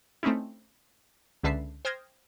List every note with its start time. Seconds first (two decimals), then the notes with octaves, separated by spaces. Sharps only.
0.23 A3 C4 C#4 D#4 E4
1.44 C#2 D3 B4 E5 A5 C7
1.85 C5 G5 D#6 F6 G#6 A#6